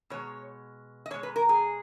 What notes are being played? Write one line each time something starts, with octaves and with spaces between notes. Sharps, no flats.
B2 G#3 C#5
D#5
B2 G#3 C#5
B4
A#4
G#4